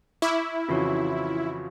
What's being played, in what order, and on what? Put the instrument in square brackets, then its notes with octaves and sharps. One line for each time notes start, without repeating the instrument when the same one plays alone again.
[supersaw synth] E4 [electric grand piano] C#6 D6 F6
[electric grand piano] F2 C#3 E3 [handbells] F4 F#4 C#5